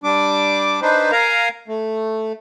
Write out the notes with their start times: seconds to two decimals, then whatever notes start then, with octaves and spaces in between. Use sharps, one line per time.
0.04 G3 D4 D6
0.82 D4 D#4 B4 C5
1.12 A#4 F5 G#5 A#5
1.68 A3